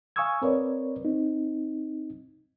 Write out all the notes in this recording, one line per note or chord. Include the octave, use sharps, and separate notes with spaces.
F5 G#5 C#6 D#6 E6 G#6
C4 A#4 B4 C#5 D5
C4 D#4